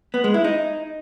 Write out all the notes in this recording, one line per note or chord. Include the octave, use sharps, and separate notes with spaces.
B3
G#3
E4
D#4